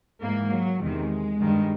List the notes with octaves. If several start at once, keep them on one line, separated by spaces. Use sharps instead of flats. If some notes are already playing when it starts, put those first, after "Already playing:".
G#2 E3 A#3
F#3
E2 C3 D#3 G#3
G2 D#3